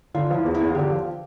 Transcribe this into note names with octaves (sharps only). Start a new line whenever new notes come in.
D3 F4
F3 E4
E2
E4
E2
F4
D3 G4
F3